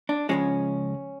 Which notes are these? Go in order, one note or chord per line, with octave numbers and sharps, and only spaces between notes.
D4
C#2 C#3 F3 G#3 C#4